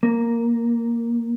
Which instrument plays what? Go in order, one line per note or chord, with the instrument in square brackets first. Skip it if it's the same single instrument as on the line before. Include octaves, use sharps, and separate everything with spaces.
[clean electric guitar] A#3